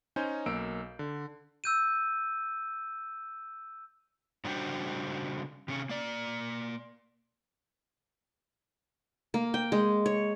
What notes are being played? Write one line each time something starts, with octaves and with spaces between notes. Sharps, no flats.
C#4 D#4 C5 G#5 G6
B1 A#3 E6 D7
D3
E6 G6 D#7
C#3 G3 D4 F#4 C5 G5
C3 C#4
A#3 D5
A#3
G5
G#3
C#5